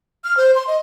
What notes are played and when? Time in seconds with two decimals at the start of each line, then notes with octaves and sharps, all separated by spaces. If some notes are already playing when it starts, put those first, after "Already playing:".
0.24 F6
0.37 C5
0.55 C6
0.67 D#5